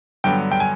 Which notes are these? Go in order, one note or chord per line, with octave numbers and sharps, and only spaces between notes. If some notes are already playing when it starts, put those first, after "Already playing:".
G2 D3 F#3 B3 G5
G5
G#5